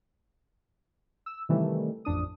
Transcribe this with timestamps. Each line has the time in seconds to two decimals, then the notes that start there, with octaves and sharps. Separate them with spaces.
1.26 E6
1.49 C3 D#3 E3 G3 A3
2.05 A1 F2 D4 D#6